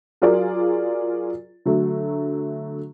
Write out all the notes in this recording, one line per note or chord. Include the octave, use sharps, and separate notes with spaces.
F#3 F4 G#4 A#4 D5
D3 F#3 A3